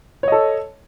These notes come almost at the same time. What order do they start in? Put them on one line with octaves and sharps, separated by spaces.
C#5 D#5 A4